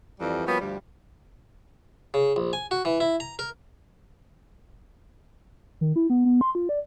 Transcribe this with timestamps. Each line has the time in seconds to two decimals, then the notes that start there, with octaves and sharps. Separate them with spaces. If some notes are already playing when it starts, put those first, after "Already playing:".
0.20 F2 E3 G3
0.47 F3 G3 A#3 B3 C#4 F#4
0.61 D2 G2 F3 G3
2.14 C#3
2.36 A#1
2.53 G#5
2.71 F#4
2.85 E3
3.00 E4
3.20 A#5
3.39 A#4
5.81 D#3
5.96 E4
6.10 B3
6.25 B3
6.41 C6
6.55 F4
6.69 D5